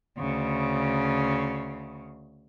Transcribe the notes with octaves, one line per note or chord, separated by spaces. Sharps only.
D2 C#3